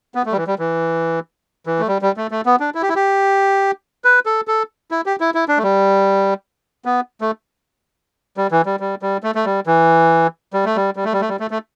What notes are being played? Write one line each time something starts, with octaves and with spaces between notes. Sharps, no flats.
B3
A3
G3
E3
G3
E3
E3
A3
G3
G3
A3
A3
B3
D4
E4
G4
E4
G4
B4
A4
A4
E4
G4
E4
E4
D4
A3
G3
B3
A3
G3
E3
G3
G3
G3
A3
A3
G3
E3
G3
A3
G3
G3
A3
G3
A3
G3
A3
A3